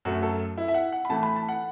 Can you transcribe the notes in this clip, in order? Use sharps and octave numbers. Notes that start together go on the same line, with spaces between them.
F#2 F#3 A3 F#4
A4
E4
E5
F#5
F#5
B5
A2 E3 A3 A5
B5
A5
F#5